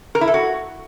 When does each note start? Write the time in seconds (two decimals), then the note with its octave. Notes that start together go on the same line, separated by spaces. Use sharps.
0.15 A#4
0.21 E4
0.28 A4
0.34 F#4